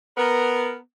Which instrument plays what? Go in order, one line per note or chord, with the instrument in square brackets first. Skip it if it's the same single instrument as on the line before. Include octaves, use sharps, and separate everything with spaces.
[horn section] B3 A#4